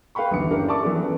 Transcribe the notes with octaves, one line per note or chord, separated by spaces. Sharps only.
B4 F5 G5 B5 C#6
G1 D#2 E3 C#7
A#3 C#4 D4 E4 G4 A#4
D5 E5 A5 C#6 D6
E3 B3 E4 A4 B4
F#2 E3